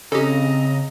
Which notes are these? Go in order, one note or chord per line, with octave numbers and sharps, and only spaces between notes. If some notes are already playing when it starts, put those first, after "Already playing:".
C#3 C4 G4 A4 D#5 A#5